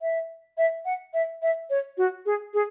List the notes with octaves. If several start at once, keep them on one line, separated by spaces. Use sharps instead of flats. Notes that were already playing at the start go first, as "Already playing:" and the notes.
E5
E5
F#5
E5
E5
C#5
F#4
G#4
G#4